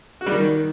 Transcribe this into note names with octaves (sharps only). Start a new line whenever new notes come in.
F#4
G3
D#3